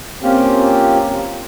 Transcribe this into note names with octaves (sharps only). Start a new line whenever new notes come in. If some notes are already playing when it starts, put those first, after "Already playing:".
A#3 C4 C#4 F4 G4